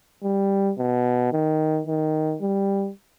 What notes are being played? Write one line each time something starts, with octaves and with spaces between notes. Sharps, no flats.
G3
B2
D#3
D#3
G3